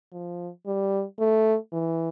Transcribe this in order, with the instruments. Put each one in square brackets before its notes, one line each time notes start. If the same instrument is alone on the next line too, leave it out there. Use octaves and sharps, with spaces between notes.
[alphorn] F3
G3
A3
E3